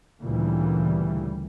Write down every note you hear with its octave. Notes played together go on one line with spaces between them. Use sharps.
D2 A#2 C#3 E3 G3